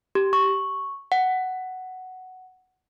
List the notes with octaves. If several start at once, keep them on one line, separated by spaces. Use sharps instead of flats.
G4
C#6
F#5